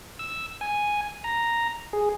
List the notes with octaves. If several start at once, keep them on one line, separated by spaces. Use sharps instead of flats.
E6
G#5
A#5
G#4